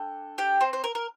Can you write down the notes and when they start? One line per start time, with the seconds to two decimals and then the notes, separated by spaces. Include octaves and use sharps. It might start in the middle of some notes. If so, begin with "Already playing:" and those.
Already playing: D4 A4 G5
0.38 G4 G5
0.61 C4 C5
0.73 C5
0.84 A#4
0.95 A#4